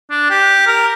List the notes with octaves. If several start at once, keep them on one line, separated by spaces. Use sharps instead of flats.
D4
G4
A#4